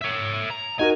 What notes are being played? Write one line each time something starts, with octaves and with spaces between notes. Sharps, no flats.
C#5 E5
A#5
D#4 F#4 A#4 G#5